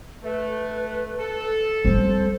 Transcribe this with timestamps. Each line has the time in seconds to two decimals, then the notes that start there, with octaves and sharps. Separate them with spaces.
0.23 A3 B4
1.19 A4
1.85 G3 C4 C5